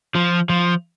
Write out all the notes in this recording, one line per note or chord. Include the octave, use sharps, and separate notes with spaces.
F3
F3